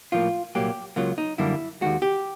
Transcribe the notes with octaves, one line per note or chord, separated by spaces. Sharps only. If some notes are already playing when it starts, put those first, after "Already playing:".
A2 F3 A#3 F4
C2 A#2 F#3 A#3 G4
C#2 C#3 F#3 A#3 F4
D#4
F#2 D3 G3 A#3 E4
D#2 D#3 G#3 F#4
G4